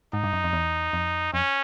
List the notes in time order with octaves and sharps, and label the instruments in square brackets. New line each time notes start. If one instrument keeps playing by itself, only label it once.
[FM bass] G#2 [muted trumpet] D#4
[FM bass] G2
F#2
F2
E2
F2
[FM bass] F2 [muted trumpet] C#4